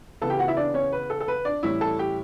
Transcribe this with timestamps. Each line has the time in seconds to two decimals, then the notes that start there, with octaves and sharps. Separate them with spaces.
0.21 C#3 E3 B3 A4 A5
0.30 G4 G5
0.39 F#4 F#5
0.48 E4 E5
0.57 D4 D5
0.74 C#4 C#5
0.92 B4
1.10 A4
1.20 A4
1.28 B4
1.45 D4 D5
1.63 A2 E3 G3 C#4 E4 E5
1.81 A4 A5
1.99 G4 G5